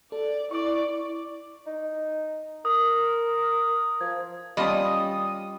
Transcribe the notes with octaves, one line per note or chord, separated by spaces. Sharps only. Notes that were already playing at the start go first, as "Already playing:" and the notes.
A4 D5
E4 D5 C#6 D6
D#4
A#4 D#6
F3 G#6
G3 C#4 F4 D#5 A5 B5 D#6